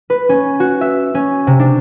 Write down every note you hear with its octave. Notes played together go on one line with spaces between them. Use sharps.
B4
C#4
F#4
E5
C#4
C3
D4